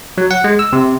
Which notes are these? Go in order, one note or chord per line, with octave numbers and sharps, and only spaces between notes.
F#3
F#5
G#3
E6
C3